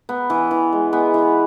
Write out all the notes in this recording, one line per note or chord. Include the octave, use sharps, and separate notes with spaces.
B3
E3
E3
G#3
B3
E3